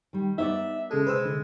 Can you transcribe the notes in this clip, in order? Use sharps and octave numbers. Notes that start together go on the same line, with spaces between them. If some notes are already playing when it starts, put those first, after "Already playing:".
D#3 G3
B3 D#4 C#5 D5 E5
C#3 G#3 A4
C3 B4 C5 E6
D3